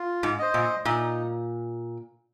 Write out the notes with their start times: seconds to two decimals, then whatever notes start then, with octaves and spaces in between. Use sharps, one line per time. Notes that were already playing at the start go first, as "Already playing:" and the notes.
Already playing: F4
0.23 G#2
0.39 C5 D#5
0.54 A#2
0.85 A#2 D#4